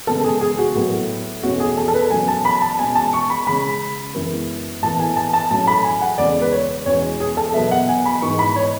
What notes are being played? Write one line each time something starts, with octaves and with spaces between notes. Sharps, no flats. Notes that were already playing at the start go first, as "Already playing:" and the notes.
C#3 G#3 B3 A4
G#4
G#4
F#4
A2 F#3 B3
E2 B2 A3 C#4 F#4
G#4
A4
A4
B4
B2 F#3 A3 C#4 G#5
A5
B5
A5
B2 G#3 C#4 G#5
A5
C#6
B5
C#3 G#3 C#4 B5
F#2 E3 G#3 B3
A2 E3 B3 A5
G#5
A5
A5
A2 F#3 A3 C#4 A5
B5
G#5
F#5
E2 C#3 G#3 C#4 D5
B4
C#5
E2 B2 G#3 C#4 C#5
G#4
A4
B2 F#3 B3 E5
F#5
G#5
B5
G#2 E3 B3 C#6
B5
C#5